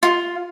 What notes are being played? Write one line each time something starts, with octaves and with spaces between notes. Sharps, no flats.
F4